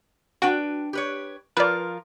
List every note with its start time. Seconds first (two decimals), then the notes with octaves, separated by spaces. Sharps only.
0.42 D4 F#4 B4 G5
0.93 G4 B4 C#5
1.57 F3 F4 A#4 B4 D5